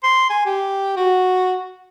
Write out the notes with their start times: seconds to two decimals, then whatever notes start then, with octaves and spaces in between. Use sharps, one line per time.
0.03 C6
0.30 G#5
0.46 G4
0.97 F#4